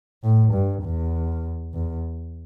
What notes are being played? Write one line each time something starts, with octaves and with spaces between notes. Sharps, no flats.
A2
G2
E2
E2